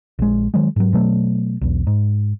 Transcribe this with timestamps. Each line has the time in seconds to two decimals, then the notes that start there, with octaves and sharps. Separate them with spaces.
0.19 A#1 G#3
0.54 D#3 F#3 G#3
0.76 G#2 F#3
0.93 B2 F#3 A3
1.61 B1 E2
1.87 G#2